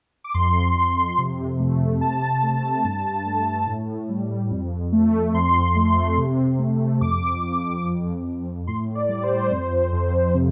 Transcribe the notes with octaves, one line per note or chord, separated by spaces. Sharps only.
D6
F2 C6
F2
C3
A3
C3 A5
A3
G2
A3
A2
G3
F2
A3
F2 C6
A3
C3
A3
F2 D6
F2
F2
F2
A2 C6
D5
G3
C5
F2
F2
C3